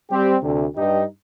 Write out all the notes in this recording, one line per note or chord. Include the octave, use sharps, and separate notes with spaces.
G3 C4 G4
D2 C3
G2 D#4 G4